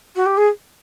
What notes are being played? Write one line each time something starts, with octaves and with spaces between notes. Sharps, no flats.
F#4
G4
G#4